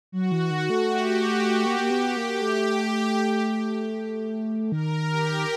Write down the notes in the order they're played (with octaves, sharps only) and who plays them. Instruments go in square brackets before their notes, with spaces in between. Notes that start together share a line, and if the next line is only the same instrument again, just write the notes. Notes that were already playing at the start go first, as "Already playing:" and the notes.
[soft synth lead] F#3 [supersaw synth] F#4
[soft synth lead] E3
D#3
A3
[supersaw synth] G4
[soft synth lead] A#3 [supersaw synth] G4
[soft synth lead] A#3
B3
A#3
[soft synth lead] A3 [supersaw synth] G4
[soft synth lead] D#3 [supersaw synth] A#4
[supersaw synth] G4